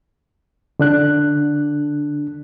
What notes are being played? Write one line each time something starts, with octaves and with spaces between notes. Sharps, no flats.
D3 D4 F#6